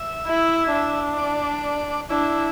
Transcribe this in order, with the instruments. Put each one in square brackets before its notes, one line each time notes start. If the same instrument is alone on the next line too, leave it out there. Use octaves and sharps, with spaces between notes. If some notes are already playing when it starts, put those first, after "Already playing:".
Already playing: [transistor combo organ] E5
[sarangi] E4
D4
[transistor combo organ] D5
[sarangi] D4 [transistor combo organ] E4